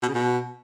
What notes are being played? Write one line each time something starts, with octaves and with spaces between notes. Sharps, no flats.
B2
C#3
B2